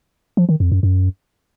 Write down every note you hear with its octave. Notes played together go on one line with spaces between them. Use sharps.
F3
D#3
F2
F#2
F#2